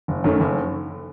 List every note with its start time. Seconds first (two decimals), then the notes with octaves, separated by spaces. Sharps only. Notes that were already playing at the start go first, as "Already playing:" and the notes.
0.08 F#1
0.24 F#2 D#3 A3
0.40 F#1